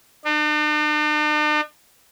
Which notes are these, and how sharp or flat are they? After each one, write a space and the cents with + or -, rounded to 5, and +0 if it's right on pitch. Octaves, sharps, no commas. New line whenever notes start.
D4 +45